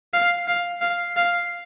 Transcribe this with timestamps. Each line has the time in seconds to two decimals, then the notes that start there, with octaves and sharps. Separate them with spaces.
0.13 F5
0.48 F5
0.82 F5
1.16 F5